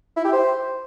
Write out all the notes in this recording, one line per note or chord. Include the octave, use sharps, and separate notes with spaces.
E4
G4
C5